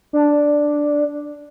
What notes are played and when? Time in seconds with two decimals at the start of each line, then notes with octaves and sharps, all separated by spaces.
0.13 D4